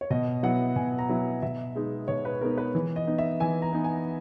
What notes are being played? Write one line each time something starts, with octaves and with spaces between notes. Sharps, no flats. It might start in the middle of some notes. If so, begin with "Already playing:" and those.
C#5
B2 D#5
F#3 B3 E4 F#5
B2 G#5
A#5
F#3 B3 E4
B2 E5
G#3 B3 D#4
B2 C#5
B4
G#3 B3 D#4 A#4
B4
E3
D#5
B3 D#4
E5
E3 G#5
A#5
B3 D#4
G#5